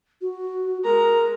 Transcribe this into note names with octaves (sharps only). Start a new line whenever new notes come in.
F#4
G#3 A#4 A#5